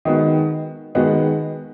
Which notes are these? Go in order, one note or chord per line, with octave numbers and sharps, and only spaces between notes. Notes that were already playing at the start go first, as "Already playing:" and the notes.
D#3 G#3 B3 F#4
D#3 G#3 B3 F#4